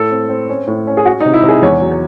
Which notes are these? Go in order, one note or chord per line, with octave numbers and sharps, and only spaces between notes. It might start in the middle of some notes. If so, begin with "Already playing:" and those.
Already playing: A2 A4
C4
C4
C#4
A2
C#4
G#4
C#4 F#4
D#4
C3
E4
C3
G#4
E2 C#5
F#3
C#5